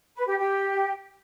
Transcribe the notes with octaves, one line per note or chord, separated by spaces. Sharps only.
B4
G4
G4